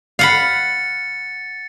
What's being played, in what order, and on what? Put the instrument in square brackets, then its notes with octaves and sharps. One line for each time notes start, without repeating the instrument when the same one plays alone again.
[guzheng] F5 F#5 B5 [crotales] A6 C#7